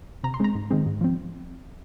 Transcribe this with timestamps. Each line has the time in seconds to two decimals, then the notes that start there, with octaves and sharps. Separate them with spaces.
0.24 C3 A#5
0.34 C6
0.40 G#3 C4 A#5
0.55 G#2
0.71 D#3 G#3 C4
0.86 G#2
1.01 F3 C4